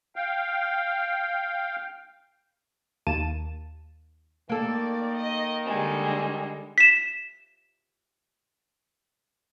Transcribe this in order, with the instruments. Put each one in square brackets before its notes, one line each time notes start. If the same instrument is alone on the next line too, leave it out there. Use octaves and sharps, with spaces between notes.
[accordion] F5 G5
[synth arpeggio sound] D#2 A#3 A5 D#7 E7
[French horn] D#3 [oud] A#3 A4 [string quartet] D5
[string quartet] D#5
D3 G3 G#3
[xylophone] B6 E7